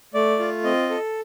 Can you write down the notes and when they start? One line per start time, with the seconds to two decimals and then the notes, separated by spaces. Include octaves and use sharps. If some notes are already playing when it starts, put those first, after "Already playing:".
0.14 A3 D5
0.39 F4
0.64 C4 D#5
0.90 A4